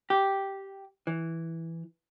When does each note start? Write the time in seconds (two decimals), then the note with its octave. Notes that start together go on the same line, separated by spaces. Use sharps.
0.10 G4
1.07 E3